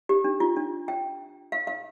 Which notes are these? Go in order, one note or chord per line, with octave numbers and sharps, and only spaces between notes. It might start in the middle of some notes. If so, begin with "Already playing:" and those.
G4
D4
F4
D4
G5
F5
F5